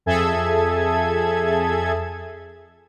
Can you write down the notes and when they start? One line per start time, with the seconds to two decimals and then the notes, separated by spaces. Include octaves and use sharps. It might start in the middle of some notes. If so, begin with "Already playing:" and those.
0.06 F2 G#4 A4 E5 G#6